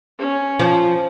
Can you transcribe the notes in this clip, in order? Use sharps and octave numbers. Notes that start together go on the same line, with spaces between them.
C#4
F3